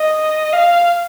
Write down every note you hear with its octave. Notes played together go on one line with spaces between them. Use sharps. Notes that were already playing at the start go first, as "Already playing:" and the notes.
Already playing: D#5
F5